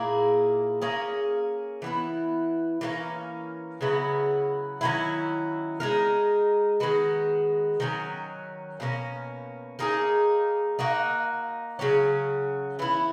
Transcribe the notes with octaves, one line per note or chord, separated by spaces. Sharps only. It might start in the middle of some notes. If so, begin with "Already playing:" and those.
Already playing: A#2 A#3 E4 G#4
A#3 C#4 G#4
E3 B3 E4
E3 A#3 C#4
C#3 F#3 B3 E4
D#3 F#3 C#4 E4
G#3 D#4 A#4
D#3 G#3 B3 F#4
D#3 F#3 C#4
B2 A#3 C#4
A#3 D#4 G#4
A#3 D#4 F#4
C#3 F#3 C#4
E3 B3 E4